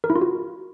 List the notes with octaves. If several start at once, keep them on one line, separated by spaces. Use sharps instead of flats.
A#4
E4
F4
F#4